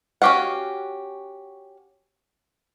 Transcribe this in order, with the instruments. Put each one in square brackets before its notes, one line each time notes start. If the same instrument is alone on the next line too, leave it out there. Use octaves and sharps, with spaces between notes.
[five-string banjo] C#4 F#4 G4 F5 F#5